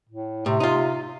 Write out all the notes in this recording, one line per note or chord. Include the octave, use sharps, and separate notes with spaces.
A2
A2 C3
D#4 F4